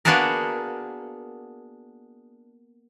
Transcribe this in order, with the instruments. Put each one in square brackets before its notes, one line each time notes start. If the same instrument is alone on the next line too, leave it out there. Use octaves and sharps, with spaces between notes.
[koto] A#3 B3 D4 F#4 G#4 A#4